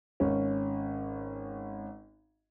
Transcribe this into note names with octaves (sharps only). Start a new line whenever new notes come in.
G#1 C#4